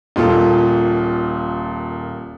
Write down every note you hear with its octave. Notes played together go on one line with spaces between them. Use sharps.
D#1 A#2 F4 A4